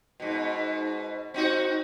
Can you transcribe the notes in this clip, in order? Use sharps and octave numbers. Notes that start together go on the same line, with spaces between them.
G#2 B2
C4 D#4 F#4